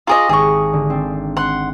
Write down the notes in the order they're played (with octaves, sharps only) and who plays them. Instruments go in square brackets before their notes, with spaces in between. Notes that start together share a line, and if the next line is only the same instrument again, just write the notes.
[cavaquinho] F4 G#4 D#5 [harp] A#5 C#6 D6
[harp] G#1 A#6 [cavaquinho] G#4 C#6
[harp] D3
C4 D4
[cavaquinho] F#5 C6